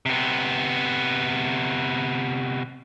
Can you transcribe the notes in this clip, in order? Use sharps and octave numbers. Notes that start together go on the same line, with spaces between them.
C3 B3